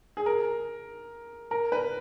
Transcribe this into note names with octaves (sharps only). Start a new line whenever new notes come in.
G#4
A#4
A#4
B4